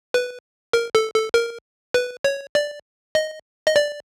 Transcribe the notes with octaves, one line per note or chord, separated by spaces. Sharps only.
B4
A#4
A4
A4
A#4
B4
C#5
D5
D#5
D#5
D5